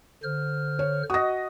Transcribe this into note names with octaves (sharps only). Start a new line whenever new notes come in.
D3 C5 F6
C#5
F#4 D#5 D#6 A#6